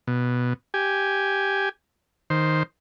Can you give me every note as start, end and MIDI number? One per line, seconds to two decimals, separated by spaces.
0.07 0.54 47
0.74 1.69 67
0.74 1.69 80
2.30 2.63 51
2.30 2.63 72